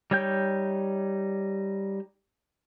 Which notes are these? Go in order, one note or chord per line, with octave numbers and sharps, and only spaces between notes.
G3 D#4 C#5 G5 G6